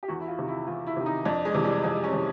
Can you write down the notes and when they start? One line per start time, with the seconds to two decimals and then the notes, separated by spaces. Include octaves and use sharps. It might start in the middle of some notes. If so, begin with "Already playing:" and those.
0.03 G4
0.08 E2 F#4
0.20 E4
0.28 F4
0.38 C3 D#3
0.48 E4
0.67 E2 F4
0.86 E4
0.96 C3 D#3
1.06 D#4
1.25 F2 D4
1.45 G#3
1.54 C3 E3
1.64 G3
1.83 F2 G#3
2.04 C#4
2.13 C3 E3